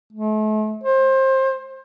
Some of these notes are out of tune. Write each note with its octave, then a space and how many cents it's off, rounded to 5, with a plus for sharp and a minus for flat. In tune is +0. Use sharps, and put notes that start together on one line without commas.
A3 -40
C5 +25